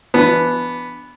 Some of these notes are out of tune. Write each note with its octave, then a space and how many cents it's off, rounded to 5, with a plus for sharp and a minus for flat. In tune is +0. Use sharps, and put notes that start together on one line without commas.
E3 +30 B3 +0 D4 +0